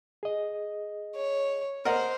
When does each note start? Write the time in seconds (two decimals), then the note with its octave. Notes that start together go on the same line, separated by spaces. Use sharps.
0.23 G#4 D#5
1.15 C#5
1.85 A#4 C5 D#5 F#5